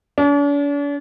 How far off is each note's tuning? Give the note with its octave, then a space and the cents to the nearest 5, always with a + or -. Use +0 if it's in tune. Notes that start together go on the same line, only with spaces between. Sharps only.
D4 -45